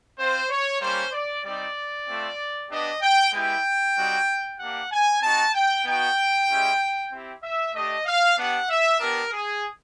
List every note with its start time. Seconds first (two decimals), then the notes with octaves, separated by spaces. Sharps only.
0.17 C4 F4 C5
0.50 C#5
0.80 G3 A#3 C#4 C5
1.12 D5
1.44 G3 C4 D#4 G4 D5
2.07 A3 C4 F4
2.70 B3 D4 G4 D#5
3.02 G5
3.33 G#3 B3 E4 G4 G5
3.96 G3 C4 D#4 F#4
4.59 A#3 D4 G4 F#5
4.91 G#5
5.22 C4 D#4 F#4 A5
5.54 G5
5.85 B3 D#4 F#4 G5
6.48 G#3 C#4 E4 G4
7.11 C4 E4 G4
7.43 E5
7.74 A3 D4 G4 D#5
8.05 F5
8.37 B3 D4 G4 F#5
8.69 E5
9.00 B3 D4 G4 A#4
9.32 G#4